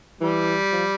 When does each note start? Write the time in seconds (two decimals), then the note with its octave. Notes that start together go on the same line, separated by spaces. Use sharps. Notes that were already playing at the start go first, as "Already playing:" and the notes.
0.21 E3 G3
0.72 F3